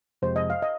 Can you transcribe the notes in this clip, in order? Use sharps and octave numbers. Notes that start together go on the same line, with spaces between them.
F2 C3 F3 G#3 C5
D#5
F5
D#5